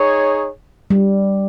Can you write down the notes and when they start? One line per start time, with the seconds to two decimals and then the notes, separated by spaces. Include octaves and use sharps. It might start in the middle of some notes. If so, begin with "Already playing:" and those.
Already playing: D#4 G#4 C#5
0.90 G3